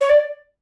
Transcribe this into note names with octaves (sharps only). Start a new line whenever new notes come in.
C#5
D5